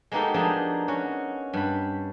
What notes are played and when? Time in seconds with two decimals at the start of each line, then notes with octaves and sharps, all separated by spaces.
0.12 G#3 A#3 B3 D#4 G4 A4
0.34 F3 D4 D#4 G#4
0.88 C#4 F#4
1.53 G2 B5